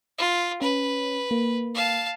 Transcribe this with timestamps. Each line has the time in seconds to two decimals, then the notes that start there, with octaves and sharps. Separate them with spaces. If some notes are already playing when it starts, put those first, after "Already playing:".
0.18 F4
0.62 C#4 B4
1.31 A#3
1.75 F5 A5